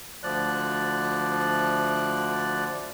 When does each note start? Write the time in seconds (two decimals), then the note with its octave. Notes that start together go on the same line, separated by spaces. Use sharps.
0.23 D2 F3 D5 F#6